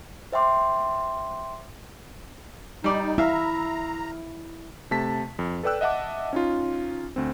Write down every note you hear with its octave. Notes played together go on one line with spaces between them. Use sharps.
C5 E5 G5 C6 D6
G3 D#4 D5
E4 E5 F5 A#5
C3 A3 A5 B6
F2
A4 B4 D5 G5 E6 F#6
D#5 E5 F#5 A5 D6
C#4 D#4 F4
D2 C4